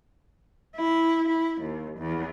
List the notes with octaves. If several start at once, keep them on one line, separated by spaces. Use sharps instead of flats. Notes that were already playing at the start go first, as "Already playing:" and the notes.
E4
E4
D#2
E2